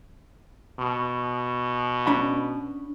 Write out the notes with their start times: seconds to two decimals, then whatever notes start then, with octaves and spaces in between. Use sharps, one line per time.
0.79 B2
2.07 C#4 D4 B5